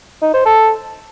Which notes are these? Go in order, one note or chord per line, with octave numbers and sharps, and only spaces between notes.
D#4
C5
A4